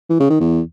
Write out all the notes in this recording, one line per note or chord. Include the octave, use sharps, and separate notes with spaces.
E3
C#3
D#3
E2